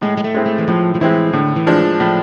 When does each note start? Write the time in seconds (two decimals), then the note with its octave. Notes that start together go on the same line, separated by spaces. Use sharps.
0.02 A2 G#3
0.17 G#3
0.24 A3
0.34 G#3 C4 E4
0.46 A3
0.58 E3
0.68 A2 F3
0.95 F3
1.01 E3 G#3 C4 E4
1.33 A2 D3
1.56 E3
1.67 F3 G#3 D4
2.00 A2 F3